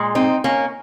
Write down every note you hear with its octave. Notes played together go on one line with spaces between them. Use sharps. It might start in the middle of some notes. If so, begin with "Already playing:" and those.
Already playing: A#2 G#3
C4 D#4
A#3 C#4